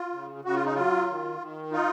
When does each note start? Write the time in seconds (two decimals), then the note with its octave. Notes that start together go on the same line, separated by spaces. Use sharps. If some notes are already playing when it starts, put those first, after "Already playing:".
Already playing: F4
0.12 C#3
0.45 C#3 F#4
0.55 F4
0.65 D#4
0.74 F#3 F4
1.09 D#3
1.41 D#3
1.72 D#4 F4